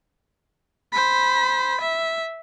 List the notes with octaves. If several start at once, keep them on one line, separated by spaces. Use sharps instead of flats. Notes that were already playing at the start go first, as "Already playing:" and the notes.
C5 B5
E5